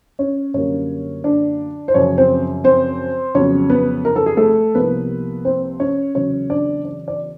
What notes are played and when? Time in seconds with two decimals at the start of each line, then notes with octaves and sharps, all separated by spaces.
0.19 C#4 C#5
0.54 F#2 D3 G3 A#3 C#4 C#5
1.24 D4 D5
1.88 C5
1.94 F#2 C#3 F3 C#4 C#5
2.18 C4 C5
2.64 C4 C5
3.35 F2 C#3 F#3 B3 C#4 C#5
3.70 B3 B4
4.05 A#4
4.16 A4
4.26 G#4
4.37 A3 A4
4.75 C2 C3 F3 A#3 B3 B4
5.45 C4 C5
5.80 C#4 C#5
6.15 E2 C#3 F#3 C#4 C#5
6.50 D4 D5
6.85 D5
7.08 D5